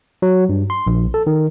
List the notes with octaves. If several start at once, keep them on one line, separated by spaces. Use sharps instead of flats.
F#3
G2
C6
A#1
A4
D#3